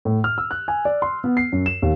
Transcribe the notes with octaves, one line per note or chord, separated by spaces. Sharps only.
A2
F6
E6
F#6
G#5
D5
C6
B3
C7
F#2
E7
D#2